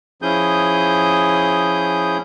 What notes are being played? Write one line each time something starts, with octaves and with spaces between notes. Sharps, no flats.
F3 C#4 E4 G#4 D#6 G6